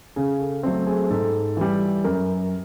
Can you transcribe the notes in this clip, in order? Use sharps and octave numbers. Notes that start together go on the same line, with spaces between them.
C#3 G#4
A4
F#3 A3 C4 A4
G#4
G#2 A4
E3 G3
F#2 A#4